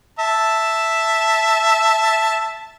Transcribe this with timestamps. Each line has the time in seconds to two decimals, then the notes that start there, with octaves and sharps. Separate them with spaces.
0.19 E5 A5